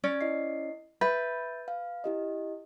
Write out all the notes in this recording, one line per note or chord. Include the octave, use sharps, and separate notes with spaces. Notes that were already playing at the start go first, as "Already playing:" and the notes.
C#4 D5
E4 D#5 C7
B4 E5 G6 A6
F5
E4 G4 D#5